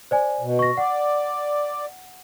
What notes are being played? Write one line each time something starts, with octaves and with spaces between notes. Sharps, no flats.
C5 D5 G#5
B2
C#6 A#6
D5 F#5